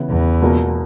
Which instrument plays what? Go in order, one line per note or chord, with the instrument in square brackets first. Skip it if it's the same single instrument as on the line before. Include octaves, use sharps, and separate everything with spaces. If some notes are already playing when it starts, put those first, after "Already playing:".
Already playing: [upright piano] C#3 E3 B3 E4
[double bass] E2
[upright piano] C#2 B2 A#3